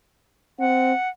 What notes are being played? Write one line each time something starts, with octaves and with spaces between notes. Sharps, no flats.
C4 F#5